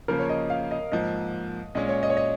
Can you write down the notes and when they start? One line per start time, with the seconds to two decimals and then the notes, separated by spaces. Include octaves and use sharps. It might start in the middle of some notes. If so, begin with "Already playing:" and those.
0.08 C#3 F3 A#3 A#4
0.19 C#5
0.29 D#5
0.50 F5
0.71 D#5
0.92 G#2 F3 A#3 D#5
1.75 A#2 G#3 C#4 D#5
1.89 C#5
2.03 D#5
2.10 C#5
2.17 D#5